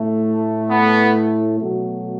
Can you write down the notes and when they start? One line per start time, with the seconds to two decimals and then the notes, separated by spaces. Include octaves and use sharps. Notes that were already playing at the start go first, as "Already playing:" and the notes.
Already playing: A2 A3
0.70 B3
1.59 B2 F#3 A3